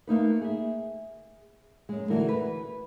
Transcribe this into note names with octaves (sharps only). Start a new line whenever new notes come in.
A3 A#3 D#4 B4
G#4 E5
F#2 G#3
D3 E3 A3 F#4 A#4
B4